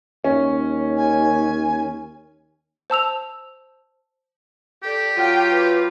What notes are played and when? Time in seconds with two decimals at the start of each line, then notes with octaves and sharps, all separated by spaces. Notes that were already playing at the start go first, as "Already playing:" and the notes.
0.24 D#2 C#4
0.97 G#5
2.90 C5 A5 E6 F7
4.83 G4 A4 D5
5.16 F#3 F4 G5
5.50 B4